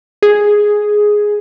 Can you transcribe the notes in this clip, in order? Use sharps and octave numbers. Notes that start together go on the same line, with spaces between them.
G#4